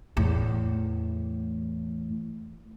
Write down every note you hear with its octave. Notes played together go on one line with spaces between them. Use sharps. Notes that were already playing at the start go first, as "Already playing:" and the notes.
E2 A2